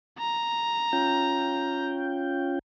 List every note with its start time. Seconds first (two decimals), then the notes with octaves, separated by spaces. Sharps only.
0.19 A#5
0.93 C#4 F4 G5